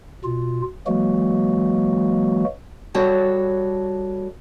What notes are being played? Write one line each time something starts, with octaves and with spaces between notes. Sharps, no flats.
B2 F4
E3 F#3 G#3 A#3 F#4
G3 F#4 A4 C#5 A5